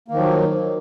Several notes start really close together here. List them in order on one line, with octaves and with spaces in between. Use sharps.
A#3 D#3 F3 F#3